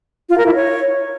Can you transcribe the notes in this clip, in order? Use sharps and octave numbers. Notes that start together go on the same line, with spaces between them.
F4
A#4
E4
C#5